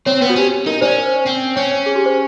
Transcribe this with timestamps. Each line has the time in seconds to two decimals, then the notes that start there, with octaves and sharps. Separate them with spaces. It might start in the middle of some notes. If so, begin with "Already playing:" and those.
0.06 C4 C#5
0.22 B3 B4
0.30 F#4
0.36 C#4 G4
0.66 D#4 A#4
0.81 C#4 C5 D5
1.26 C4
1.56 C#4 C#5
1.72 C#5
1.86 G#4
1.95 G4
2.06 C5